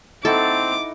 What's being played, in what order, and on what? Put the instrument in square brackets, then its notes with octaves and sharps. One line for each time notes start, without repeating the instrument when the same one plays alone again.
[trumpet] C4 [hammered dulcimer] D#4 E4 F#4 [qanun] A4 [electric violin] D6